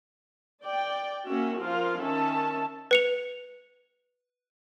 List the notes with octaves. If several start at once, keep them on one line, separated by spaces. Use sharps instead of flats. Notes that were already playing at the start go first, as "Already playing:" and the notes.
D5 G5
A#3 C#4 F#4 E5
F3 F4 A#4 F5
D#3 C#4 E5 A5
B4 C#7 F7